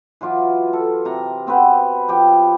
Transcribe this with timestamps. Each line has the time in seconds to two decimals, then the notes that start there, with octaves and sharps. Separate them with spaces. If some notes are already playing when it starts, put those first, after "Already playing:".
0.21 E3 F#3 F4 D6
0.73 A4
1.05 C3 A#5
1.47 B3 C4 F#4 B4
2.08 F3 G4 G5